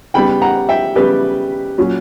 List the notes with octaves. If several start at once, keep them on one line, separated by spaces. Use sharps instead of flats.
C#3 G3 B3 G5 B5
F#5 A#5
E5 G5
C#3 G3 B3 G4 B4
A#2 F#3 C#4